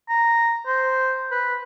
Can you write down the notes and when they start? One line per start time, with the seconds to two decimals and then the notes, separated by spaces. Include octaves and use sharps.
0.09 A#5
0.67 C5
1.31 B4